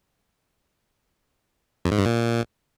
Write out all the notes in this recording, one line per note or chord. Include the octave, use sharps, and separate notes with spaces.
F2
G#2
G2
A#2